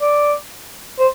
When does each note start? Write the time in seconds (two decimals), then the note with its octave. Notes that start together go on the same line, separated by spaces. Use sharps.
0.01 D5
0.99 C5